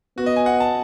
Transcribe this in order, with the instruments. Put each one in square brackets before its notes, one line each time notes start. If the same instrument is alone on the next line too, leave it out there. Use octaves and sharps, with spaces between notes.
[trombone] B3 [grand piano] F#4
[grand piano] D#5
G#5
F#5
A5